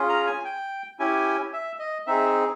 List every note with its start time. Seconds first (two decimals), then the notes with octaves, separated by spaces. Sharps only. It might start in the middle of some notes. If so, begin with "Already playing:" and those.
Already playing: C#4 F4 G#4
0.09 A#5
0.27 G#5
0.45 G5
0.99 C#4 E4 G4 G#5
1.53 E5
1.79 D#5
2.07 C4 D#4 G#4 E5